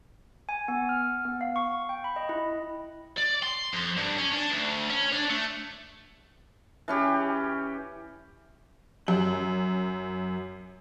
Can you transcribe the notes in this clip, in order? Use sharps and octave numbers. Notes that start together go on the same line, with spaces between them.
G#5
B3
F6
B3
F5
C#6
G5
B5
D#5
E4
D5
C6
F2
G2
C#4
D4
D2
C#4
D4
A3
E3 C#4 G4
F#2 F#7